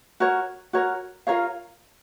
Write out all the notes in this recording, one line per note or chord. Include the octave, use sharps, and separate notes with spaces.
F#4 A#4 C#5
F#4 A#4 C#5
F4 A#4 C#5 F5